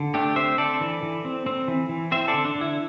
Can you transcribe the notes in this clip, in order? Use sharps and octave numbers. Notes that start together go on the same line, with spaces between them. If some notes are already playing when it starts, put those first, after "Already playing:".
Already playing: D3
A3 D4 G4
C4 C5 E5
D3 A4 D5
E3
E3
C4
C4
E3
E3
C4 C5 E5
A4 D5
D3
D4
D3
E4